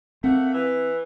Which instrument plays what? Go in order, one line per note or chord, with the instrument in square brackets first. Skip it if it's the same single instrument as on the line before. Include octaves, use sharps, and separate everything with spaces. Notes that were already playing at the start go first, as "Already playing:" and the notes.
[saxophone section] A3 A#3 F#5 [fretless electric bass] C4
[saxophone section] E3